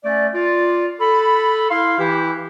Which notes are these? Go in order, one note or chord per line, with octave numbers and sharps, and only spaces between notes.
A3 C#4 D5
F4 D5
A4 B5
E4 F5 C6
E3 E4 G4